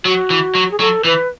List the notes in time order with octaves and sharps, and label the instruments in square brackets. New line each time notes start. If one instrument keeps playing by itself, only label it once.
[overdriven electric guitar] F#3 [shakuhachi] F#4
[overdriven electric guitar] E3
F#3
[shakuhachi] G#4
[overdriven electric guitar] F#3 [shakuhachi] A4
[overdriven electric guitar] E3 [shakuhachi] B4